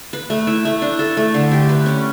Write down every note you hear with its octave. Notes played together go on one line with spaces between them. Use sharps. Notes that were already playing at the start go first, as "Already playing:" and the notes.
B4
A3
E4
A3
D4
A4
A3
D3
G4
B4
C#4